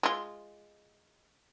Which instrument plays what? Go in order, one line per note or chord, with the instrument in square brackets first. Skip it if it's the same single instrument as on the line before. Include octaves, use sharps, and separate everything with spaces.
[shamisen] G#3 F4